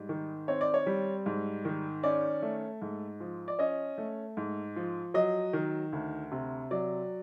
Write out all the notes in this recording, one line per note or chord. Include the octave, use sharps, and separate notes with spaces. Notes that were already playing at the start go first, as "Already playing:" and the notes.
Already playing: G#2 G3
D#3
C4 C#5
D5
C#5
G3
G#2
D#3
C#4 D5
A3
G#2
F3
D5
C#4 D#5
A3
G#2
F3
F#3 D#5
D#3
D2
C3
F#3 D5